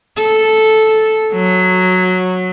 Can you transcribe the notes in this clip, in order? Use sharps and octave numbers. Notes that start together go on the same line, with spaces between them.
A4
F#3